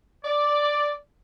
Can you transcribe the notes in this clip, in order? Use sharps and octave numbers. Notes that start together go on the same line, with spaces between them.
D5